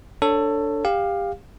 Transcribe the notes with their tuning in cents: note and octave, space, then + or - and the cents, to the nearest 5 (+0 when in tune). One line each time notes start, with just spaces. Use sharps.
D4 -5 A4 +15 C#5 +0
G4 +25 F5 +10